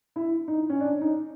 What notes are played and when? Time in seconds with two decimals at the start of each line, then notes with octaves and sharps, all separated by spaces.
0.16 E4
0.48 D#4
0.70 C#4
0.80 D4
1.01 D#4